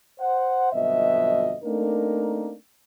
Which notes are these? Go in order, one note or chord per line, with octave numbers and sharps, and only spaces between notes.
C5 F#5
G1 F2 B2 F#3 D#5 E5
A3 A#3 C4 D4 D#4 A#4